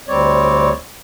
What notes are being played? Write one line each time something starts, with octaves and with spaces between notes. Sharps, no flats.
D2 G3 C4 C#5 D5